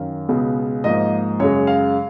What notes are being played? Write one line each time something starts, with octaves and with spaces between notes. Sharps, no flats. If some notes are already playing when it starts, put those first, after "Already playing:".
Already playing: F#2 D#3 F5
C#2 B2 G#3 B3
G#2 F3 A#3 D#5
F#2 C#3 G#3 C#5
F5